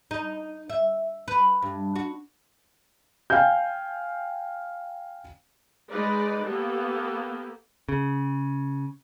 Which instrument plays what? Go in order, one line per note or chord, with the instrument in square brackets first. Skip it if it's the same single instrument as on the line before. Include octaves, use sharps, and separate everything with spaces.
[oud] D#4
E5
B4
G2
F#4
[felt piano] F5 G5 G#5 G6
[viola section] G#3 D#4 B4 D5
A#3 B3 G4 A4
[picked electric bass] C#3